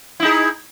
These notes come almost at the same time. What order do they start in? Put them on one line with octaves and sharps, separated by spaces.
E4 D#4 G#4